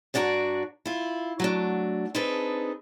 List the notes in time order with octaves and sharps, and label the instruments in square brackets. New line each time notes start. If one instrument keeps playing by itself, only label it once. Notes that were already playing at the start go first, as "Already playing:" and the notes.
[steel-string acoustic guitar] G2 D4 F#4 D5 A#5
E4 F4
F#3 A3 D4
C4 D4 D#4 G#4 A4 B4